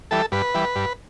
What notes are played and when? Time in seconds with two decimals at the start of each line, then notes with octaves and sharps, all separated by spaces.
0.11 E3 G3 A4
0.32 G2 B4
0.54 E3 G3
0.76 G2